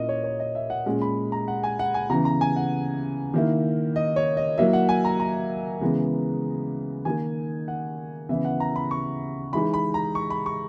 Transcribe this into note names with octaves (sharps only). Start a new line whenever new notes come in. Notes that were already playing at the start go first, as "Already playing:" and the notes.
Already playing: A#2 A#3 C#4 E4 D#5
C#5
C#5
D#5
E5
F#5
A#2 G#3 C#4
B5
A#5
F#5
G#5
F#5
G#5
C#3 E3 B3 A#5
A#5
G#5
F#5
D#3 A#3 E4
D#5
C#5
D#5
F#3 A#3 E4 E5
F#5
G#5
A#5
A#5
C#3 E3 G#3 B3
D#3 A#3 D#4 G#5
F#5
C#3 E3 B3 E4 E5
F#5
A#5
B5
C#6
E3 G#3 D#4 B5
B5
A#5
C#6
B5
C#6